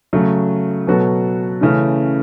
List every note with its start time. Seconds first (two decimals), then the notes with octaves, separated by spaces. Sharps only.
0.13 C#3 F#3 A3
0.87 B2 F#3 B3 F#4 A4
1.61 C#3 E3 A3 C#4